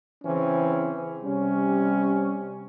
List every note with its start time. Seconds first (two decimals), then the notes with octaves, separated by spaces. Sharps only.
0.24 C#3 E3 C4 C#4
1.23 C3 G3 C#4